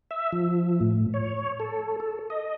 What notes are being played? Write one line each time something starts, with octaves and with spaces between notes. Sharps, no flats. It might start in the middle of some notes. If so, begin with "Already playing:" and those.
E5
F3
A2
C#5
A4
A4
D#5